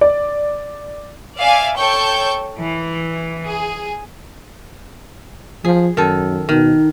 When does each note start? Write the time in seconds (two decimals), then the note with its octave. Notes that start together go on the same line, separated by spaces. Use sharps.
0.01 D5
1.39 D5 E5 F5 G#5
1.78 A4 C#5 G5 C#6 G6
2.60 E3
3.46 G#4
5.65 F3 G#4
5.97 F#2 D#3 A4
6.49 B2 D#3 D#4